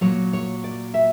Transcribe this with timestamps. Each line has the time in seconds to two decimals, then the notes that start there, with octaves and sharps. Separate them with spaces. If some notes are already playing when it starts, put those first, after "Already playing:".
0.01 A#2 F#3 C#5
0.33 C#5
0.64 D5
0.94 E5